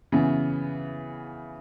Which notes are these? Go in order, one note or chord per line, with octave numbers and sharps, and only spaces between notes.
C#3 E3 B3